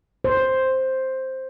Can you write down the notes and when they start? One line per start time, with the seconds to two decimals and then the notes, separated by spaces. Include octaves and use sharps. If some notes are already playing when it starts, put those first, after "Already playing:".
0.24 C5